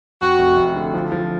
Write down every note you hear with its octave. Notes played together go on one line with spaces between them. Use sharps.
F2 F#4
F1
F1
D3
F3
F3